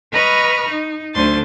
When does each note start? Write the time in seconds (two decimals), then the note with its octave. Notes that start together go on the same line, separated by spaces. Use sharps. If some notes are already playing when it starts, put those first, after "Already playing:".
0.13 B4 D#5 A#5 B5 C#6 F6
0.69 D#4
1.14 D2 D3 F#3 C5 C6 A6